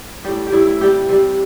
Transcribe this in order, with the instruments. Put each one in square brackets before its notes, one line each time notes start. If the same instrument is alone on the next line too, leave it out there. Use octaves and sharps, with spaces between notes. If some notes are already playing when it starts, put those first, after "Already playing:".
[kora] A2 G3 G4
G4
A2 G3 E4
E4
C3 G3 G4
C3 G3